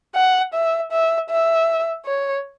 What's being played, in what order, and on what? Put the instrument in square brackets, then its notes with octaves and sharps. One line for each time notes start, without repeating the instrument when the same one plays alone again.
[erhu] F#5
E5
E5
E5
C#5